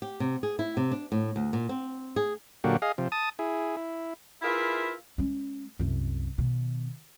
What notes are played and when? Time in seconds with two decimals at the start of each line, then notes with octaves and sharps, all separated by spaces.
0.02 G4
0.20 C3
0.43 G#4
0.59 E4
0.77 C3
0.92 D4
1.12 A2
1.36 D2
1.53 A#2
1.69 C4
2.16 G#4
2.64 A#2 D3 F#3 A#3 F#4 G4
2.82 G#4 D#5 F5
2.98 C3 F3
3.12 A5 D#6
3.39 E4 G#4
3.77 E4
4.42 E4 F4 G#4 A#4 B4 E5
5.18 G#3 C#4
5.79 C2 F#2
6.38 B2 D#3